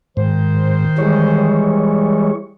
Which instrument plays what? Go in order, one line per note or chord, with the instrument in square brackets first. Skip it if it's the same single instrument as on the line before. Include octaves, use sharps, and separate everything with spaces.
[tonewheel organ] G#2 [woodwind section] D#3 C5
[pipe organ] E3 G3 G#3 [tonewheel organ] C#5